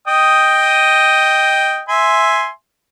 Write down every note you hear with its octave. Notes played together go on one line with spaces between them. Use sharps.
D#5 G5 D#6
E5 G#5 C6